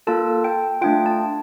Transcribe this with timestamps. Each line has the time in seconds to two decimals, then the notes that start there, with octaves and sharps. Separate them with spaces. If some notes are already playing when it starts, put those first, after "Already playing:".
0.07 A#3 F4 A4 A5
0.44 G5
0.81 A3 D4 F4 G5
1.06 A5